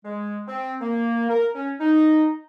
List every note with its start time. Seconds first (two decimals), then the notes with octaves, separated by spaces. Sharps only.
0.05 G#3
0.48 C4
0.81 A#3
1.30 A#4
1.55 C#4
1.80 D#4